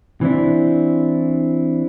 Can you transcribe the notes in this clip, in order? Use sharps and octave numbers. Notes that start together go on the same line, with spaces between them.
E3 C4 D4 E4